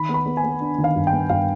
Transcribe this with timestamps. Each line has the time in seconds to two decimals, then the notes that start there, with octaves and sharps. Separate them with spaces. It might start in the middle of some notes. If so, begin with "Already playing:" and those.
Already playing: D#3 B5
0.09 B3
0.14 B5
0.26 B3
0.37 G#5
0.44 B3
0.61 D4
0.78 D#3
0.84 F5
0.96 G2
1.07 G5
1.13 B3
1.30 G2 F5